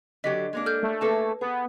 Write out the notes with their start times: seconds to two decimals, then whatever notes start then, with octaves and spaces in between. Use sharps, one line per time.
0.24 D3 F#3 G4 D#5 B6
0.53 G#3 A#3 D4
0.66 A4 F6 G6
0.83 A3
1.01 A#3 G#4 A4 B4 A5
1.41 B3 G#4